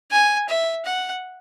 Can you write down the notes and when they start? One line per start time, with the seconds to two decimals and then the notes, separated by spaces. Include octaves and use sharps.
0.11 G#5
0.49 E5
0.85 F#5